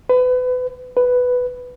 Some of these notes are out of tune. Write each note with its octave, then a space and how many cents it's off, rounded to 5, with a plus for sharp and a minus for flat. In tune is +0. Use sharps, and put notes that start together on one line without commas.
B4 +30
B4 +5